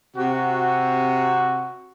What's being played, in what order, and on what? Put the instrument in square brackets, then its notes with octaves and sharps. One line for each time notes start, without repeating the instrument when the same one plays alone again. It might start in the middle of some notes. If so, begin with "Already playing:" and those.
[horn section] C3 F#4